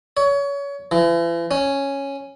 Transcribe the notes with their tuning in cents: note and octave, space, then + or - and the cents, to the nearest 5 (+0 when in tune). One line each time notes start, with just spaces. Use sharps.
C#5 +25
E3 +40
C#4 -5